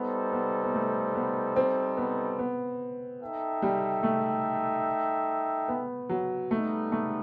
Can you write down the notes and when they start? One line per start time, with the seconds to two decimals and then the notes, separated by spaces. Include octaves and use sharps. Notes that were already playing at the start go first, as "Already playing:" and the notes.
Already playing: G3 B3 D#4 A4 C5
0.32 B3
0.64 B3
0.74 A3
1.15 B3
1.56 C4
1.97 B3
2.39 B3
3.21 D#4 A4 E5 G5
3.62 G3
4.03 A3
5.68 B3
6.09 F#3
6.51 G3 A3 B3 D#4 A4
6.92 A3